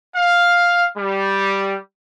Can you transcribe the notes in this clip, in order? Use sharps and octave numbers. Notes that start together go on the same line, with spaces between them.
F5
G3